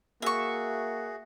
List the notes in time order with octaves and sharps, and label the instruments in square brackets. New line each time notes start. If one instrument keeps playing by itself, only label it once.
[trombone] A#3 [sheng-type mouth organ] F#4 G#4 [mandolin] E5 C#6